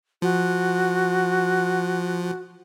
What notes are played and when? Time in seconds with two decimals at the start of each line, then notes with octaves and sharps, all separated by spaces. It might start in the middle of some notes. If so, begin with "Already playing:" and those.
0.22 F3 F#4